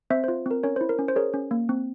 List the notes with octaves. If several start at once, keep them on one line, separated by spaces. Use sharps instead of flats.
C4 C5 E5
C5
F4
C4 A#4
C#4 A#4 C#5
C5
E4
A#4
C#4
C5
G#4 A#4 C#5
C#4
A#3
C4